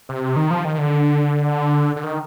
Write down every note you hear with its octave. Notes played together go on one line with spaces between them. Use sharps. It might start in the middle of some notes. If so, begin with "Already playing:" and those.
C3
D#3
F3
D#3
D3
D3
D#3